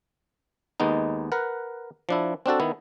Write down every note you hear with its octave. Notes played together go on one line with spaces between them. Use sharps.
D#2 G#3 B3 D#4
A#4 B4 F#5
F3 D4 E4
C4 D4 F#4 A4
D#3 B3 E4